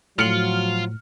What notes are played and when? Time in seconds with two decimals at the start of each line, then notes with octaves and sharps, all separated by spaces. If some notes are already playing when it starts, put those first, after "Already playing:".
0.19 A2 F3 F#3 F4 F6 C#7 F#7